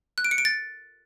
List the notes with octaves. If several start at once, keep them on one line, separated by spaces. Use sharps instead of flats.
F#6
D7
C#7
D7
A6